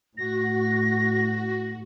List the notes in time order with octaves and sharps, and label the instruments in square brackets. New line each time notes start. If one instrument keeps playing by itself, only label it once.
[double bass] A2 [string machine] F#4 [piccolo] A#6